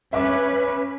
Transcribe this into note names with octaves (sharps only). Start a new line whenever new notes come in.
C#4 B4 E5 D6